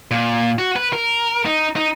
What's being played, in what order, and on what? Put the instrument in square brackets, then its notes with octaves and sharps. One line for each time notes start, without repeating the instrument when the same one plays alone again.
[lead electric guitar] A#2
F#4
B4
A#4
D#4
D#4